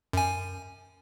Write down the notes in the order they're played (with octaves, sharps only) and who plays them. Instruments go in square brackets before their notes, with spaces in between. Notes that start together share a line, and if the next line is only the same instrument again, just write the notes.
[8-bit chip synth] F#2 G#5